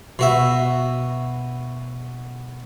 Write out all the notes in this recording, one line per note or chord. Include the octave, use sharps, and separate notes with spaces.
B2 F#4 E5